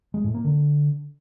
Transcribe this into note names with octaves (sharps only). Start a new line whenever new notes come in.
G#3
A2
A#3
D3